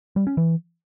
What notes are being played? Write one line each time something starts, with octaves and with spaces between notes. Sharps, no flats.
G3
C#4
E3